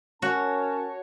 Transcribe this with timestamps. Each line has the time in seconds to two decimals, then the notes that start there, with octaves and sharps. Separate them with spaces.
0.22 C#4 F#4 A#4 C#5 A5